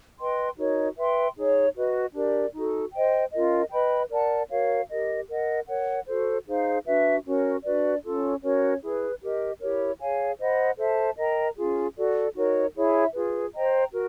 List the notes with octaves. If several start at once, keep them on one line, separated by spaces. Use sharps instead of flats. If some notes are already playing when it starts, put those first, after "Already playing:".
B4 D#5 G5 C6
D#4 F#4 A#4 C#5
B4 E5 G5 C6
D#4 G#4 C#5
F#4 B4 D#5
D4 G4 A#4 D5
D#4 F#4 A4
C5 D#5 G5
C#4 F4 A#4 D#5
B4 D#5 G5 B5
A#4 D5 F#5 A5
F#4 A#4 C#5 F5
G4 A#4 D#5
A#4 D#5 F#5
A#4 C#5 F#5
F#4 A4 C5
D#4 G#4 C5 F5
D4 F#4 B4 E5
C#4 F#4 A#4
D4 F#4 B4 D5
C#4 F4 A4
C#4 F#4 A#4 C#5
E4 G#4 B4
G4 A#4 D#5
E4 G4 A#4 C#5
G#4 C#5 F5 G#5
C5 D#5 F#5 B5
A4 C5 E5 A5
A#4 D#5 G5 A#5
C#4 F4 G#4
F#4 A4 D5
D#4 F#4 A#4 C#5
E4 G#4 C#5 E5
F4 G#4 B4
C5 D#5 G5 A#5
F#4 A#4